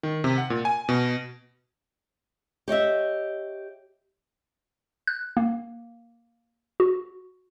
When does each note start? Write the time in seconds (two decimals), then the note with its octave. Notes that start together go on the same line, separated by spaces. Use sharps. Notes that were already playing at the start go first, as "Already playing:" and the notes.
0.03 D#3
0.24 C3
0.38 F#5
0.50 A#2
0.65 G#5
0.89 B2
2.68 G4 C#5 D#5 E5
5.07 F#6
5.37 A#3
6.80 F#4